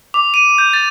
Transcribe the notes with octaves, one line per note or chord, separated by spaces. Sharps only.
D6
D#7
G6
A6